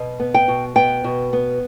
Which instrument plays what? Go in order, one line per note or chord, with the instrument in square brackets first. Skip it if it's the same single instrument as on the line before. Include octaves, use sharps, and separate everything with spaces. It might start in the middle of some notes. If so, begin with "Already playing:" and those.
Already playing: [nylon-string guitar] B2
B3
G5
B2
B3 G5
B2
B3